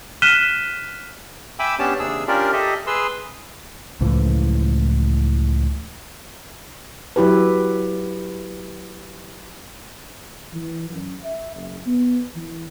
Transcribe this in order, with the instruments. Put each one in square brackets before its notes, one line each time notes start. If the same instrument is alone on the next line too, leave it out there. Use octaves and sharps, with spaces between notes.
[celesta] F6 F#6 B6 D#7 E7 G7
[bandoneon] E5 G5 G#5 B5 D6 E6
B3 C#4 D4 G4 C#5 A5
D#2 C3 D4 G#4 E6
C#4 D4 F4 G4 A#4 D5
G4 A4 D#5 E5
G#4 B4 C6 E6
[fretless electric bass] C#2 A2 E3 F3
[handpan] F#3 E4 G4 B4
[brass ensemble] E3
F#2
E5
F#1
B3
E3